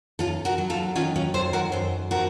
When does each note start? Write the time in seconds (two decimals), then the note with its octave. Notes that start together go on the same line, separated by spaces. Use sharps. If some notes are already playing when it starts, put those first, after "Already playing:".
0.19 F#2 F4 A4
0.45 F#4 A#4
0.58 F#3
0.70 F4 A4
0.95 D#3 C#4 F4
1.16 C#4 F4
1.34 F#2 A4 C5
1.53 F#4 A#4
1.72 F#2 A4 C5
2.11 F3 F#4 A#4